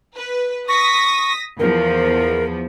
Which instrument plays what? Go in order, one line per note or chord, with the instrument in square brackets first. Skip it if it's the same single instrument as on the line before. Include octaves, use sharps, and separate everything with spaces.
[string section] B4
[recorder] C#6 [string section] D#6 A#6 B6
[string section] E2 F3 [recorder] A#4